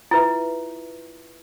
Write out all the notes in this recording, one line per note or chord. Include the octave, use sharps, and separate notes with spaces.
E4 F4 B4 E5